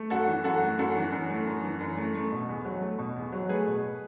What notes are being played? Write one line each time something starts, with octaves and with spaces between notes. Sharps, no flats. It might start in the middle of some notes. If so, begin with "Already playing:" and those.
Already playing: A3
F#2 F#4 A4
E3
F#2 F#4 A4
A3
F#2 F#4 A4
E3
F#2
A3
F#2
E3
F#2
A3
A3
B2
E2
F#3
A3
B2
E2
F#3
A3 G#4 B4
B2